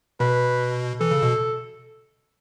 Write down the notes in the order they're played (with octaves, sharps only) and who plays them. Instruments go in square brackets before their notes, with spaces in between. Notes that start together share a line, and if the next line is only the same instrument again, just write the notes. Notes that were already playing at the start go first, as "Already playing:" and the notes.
[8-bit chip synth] B2 [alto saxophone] B4
[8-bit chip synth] E3 [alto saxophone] A4
[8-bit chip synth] C#3
B2